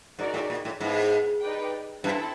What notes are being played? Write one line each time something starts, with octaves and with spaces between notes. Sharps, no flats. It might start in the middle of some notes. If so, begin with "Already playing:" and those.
G#2 D#4 F#4 A#4 D5
A2
A#2
A2
G#2 B3 E4 A4 C5 F5
D#4 G4 B4 D5 G5
G2 C4 E4 A4